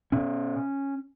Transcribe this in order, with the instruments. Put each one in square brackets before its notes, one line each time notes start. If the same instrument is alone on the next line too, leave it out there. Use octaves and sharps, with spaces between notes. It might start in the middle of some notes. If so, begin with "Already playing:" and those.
[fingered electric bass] B2 C#4